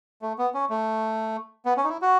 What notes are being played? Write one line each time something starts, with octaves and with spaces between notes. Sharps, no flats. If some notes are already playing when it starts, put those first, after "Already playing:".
A3
B3
C#4
A3
B3
C#4
D#4
E4
F#4